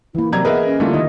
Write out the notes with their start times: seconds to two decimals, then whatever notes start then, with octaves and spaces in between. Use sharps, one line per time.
0.15 E3 A#3 E4
0.32 C3 F#3 D5 A#5 G#6
0.45 B3 G#4 A#4 B4 D#5 E5
0.65 C#4
0.80 D3 G3 A3 A#3 E4 F4
0.93 D#3 D#4 D#5